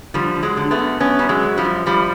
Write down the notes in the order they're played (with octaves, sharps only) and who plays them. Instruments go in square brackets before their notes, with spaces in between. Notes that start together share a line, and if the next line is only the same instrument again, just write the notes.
[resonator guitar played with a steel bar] D3 F3 G3
D3
F#3 G#3
D3
A3 B3
F#2
F#2 B3 C#4
F#2 G3
F#3 G#3
F#2
F3 G3
F#2
F#2 F3 G3